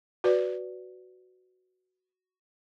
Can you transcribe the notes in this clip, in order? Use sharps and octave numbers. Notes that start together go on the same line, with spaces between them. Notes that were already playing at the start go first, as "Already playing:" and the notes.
F#4 B4 D5